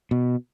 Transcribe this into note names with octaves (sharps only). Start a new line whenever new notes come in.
B2